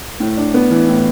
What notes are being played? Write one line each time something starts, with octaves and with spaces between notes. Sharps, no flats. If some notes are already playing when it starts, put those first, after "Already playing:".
A2
D4
B3
E3
A2